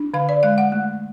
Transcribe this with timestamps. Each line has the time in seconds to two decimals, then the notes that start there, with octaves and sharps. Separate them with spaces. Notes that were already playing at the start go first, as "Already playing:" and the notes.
Already playing: D4
0.14 D3 F5
0.29 D5
0.43 G#3 F5
0.58 F#5
0.72 A3